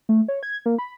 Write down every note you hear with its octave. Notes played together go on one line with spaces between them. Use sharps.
A3
C#5
G#6
A#3
B5